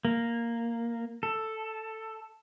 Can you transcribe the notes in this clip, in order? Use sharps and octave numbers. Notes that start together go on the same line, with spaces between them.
A#3
A4